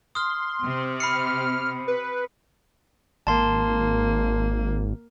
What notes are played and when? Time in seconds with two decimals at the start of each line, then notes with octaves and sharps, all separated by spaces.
0.15 C6 D#6 F6
0.63 C3
1.00 B5 F6 C7 C#7
1.88 B4
3.27 G#1 A#3 A5 C6